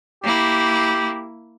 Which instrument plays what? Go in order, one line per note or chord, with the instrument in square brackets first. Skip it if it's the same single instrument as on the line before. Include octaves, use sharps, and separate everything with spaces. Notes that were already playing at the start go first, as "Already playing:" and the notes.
[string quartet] A#3 E4 [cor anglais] G4